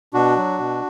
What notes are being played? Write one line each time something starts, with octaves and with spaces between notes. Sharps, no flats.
B2 D4 F#4
F#3
B2